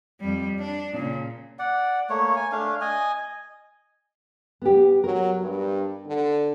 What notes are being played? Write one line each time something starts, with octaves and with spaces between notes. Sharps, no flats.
F2 G3
D4
A#2 C#3
D5 F#5
A3 A#3 C#5
G#5
A3 D4 F5
D#5 G#5
B3 G4
F#3 A#4
G2
D3